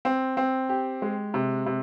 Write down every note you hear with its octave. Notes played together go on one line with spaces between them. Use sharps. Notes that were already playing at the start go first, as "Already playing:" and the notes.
C4
C4
G4
G#3
C3
C3